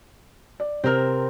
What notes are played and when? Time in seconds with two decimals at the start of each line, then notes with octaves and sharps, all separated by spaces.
0.60 D5
0.84 C3 C4 A#4 F6